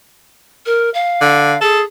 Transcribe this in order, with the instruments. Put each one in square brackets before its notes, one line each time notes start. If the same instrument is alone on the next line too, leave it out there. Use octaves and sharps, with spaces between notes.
[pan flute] A#4
F5
[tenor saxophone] D3
[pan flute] G#4 [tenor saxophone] A4